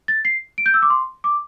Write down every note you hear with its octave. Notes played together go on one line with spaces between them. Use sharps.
A6
C7
D7
G6
E6
D6
C6
D6